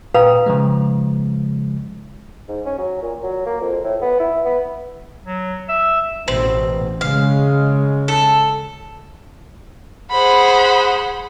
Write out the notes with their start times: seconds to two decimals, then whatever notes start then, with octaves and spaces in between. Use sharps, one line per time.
0.14 A#2 B4 F5 G5 A#5 D#6
0.46 C#3 F3 G#3
2.48 G#2
2.65 C#4
2.78 F#3
3.02 A#2
3.23 F#3
3.46 A#3
3.61 F2
3.84 A2
4.01 B3
4.19 E4
4.44 B3
5.25 F#3
5.69 E5
6.28 A1 B2 C4
7.01 C#3 G#3 F5
8.08 A4
10.11 G#4 C5 F#5 B5